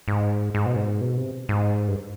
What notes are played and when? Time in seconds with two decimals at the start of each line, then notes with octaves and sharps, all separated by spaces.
0.08 G#2
0.55 G#2
0.66 B2
0.76 G#2
1.01 B2
1.17 C3
1.49 G#2
1.88 G2